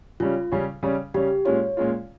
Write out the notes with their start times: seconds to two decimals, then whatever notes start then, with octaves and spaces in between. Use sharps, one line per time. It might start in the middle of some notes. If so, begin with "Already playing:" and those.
0.20 C#3 G3 C#4 F4
0.52 C#3 G3 C#4
0.83 C#3 G3 C#4
1.14 C#3 G3 C#4 G4
1.45 A#2 G#3 C#4 F4 C#5
1.77 A#2 G#3 C#4 F4